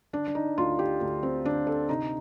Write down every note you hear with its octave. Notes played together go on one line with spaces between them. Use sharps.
D3 D4
D4
D#4
D2 F4
G4
D2
C4
D3 D4
A4
C3 D#4